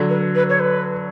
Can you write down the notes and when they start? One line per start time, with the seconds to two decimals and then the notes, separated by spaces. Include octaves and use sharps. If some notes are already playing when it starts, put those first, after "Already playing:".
Already playing: D3 F#3
0.09 B4
0.35 B4
0.49 C#5
0.59 B4